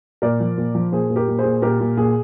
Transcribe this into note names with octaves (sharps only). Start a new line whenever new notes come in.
A#2 A#4 D5
F3
A#2
F3
A#2 G#4 C5
A#2
G4 A#4
A#2
G#4 C5
A#2
A#2 G4 A#4
A#2
A#2 G#4